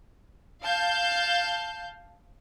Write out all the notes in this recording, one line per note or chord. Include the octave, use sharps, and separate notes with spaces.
F5 A5 G6